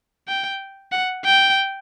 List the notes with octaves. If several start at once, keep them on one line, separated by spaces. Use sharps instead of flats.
G5
F#5
G5